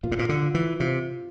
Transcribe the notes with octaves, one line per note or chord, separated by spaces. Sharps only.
A#2 F4
A2
A#2
D3
F4
E3
C3 F4